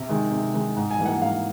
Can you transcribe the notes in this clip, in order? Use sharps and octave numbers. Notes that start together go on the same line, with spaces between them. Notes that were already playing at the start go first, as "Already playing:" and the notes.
Already playing: C3
D#3 G#3
C3
D#3 G#3
G#2
G#5
E3 G3 A#3
F#5
G#2 F5